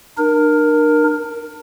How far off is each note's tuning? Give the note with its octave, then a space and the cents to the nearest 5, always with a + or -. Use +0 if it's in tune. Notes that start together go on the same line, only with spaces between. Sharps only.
D4 +45 A#4 +10